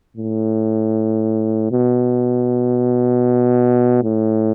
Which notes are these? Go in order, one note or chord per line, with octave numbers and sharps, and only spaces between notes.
A2
B2
A2